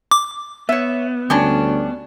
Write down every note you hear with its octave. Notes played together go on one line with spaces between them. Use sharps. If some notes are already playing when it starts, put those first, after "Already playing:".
D6
B3 C#5 E5
D2 G3 C#4 D4